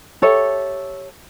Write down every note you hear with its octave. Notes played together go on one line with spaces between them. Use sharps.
G4 A4 C#5 E5